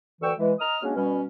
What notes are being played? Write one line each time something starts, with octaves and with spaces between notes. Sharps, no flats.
D2 D3 E3 G5 C#6 E6
E3 G#3
D#5 A#5 D#6 F6
F#3 G#3 A#3 C#4 D4
B2 G3 C#4